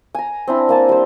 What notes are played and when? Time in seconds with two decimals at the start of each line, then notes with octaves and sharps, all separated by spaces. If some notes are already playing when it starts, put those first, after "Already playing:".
0.14 G#5 A#5
0.47 C4 D4 E4
0.69 A#3 G#5 A5
0.89 G3 C5